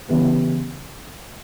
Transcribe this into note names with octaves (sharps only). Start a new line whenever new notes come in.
C#3 E3 G3 B3